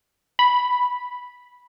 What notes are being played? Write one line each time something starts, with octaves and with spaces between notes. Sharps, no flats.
B5